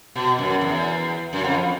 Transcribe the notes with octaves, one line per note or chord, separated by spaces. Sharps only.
B2
F#2
E2
F#2
F2